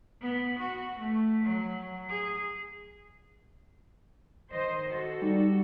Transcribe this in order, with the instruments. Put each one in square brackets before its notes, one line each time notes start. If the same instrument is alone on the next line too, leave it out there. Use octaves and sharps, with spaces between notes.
[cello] B3
F#4
A3
F#3
G#4
[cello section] D#3 C5 D#5
F#4 A4
[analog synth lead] G3 [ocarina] D#4